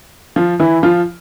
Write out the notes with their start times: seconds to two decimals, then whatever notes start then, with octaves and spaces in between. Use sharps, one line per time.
0.36 F3 F4
0.60 E3 E4
0.83 F3 F4